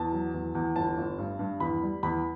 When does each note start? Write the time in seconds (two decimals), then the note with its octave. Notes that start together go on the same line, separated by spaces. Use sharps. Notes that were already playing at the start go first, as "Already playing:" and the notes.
Already playing: E2 A5
0.13 F#3
0.34 E2
0.55 E2
0.76 G1 A5
0.97 G1
1.18 G2
1.39 G2
1.60 E2 B5
1.82 G3
2.03 E2 B5